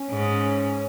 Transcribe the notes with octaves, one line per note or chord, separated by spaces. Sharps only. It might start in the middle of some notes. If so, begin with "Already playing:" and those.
Already playing: C#4
G#2